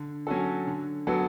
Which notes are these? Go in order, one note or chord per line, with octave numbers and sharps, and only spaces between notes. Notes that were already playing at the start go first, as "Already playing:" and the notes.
Already playing: D3
F#3 C#4 F#4 A4
D3
F#3 B3 F#4 A4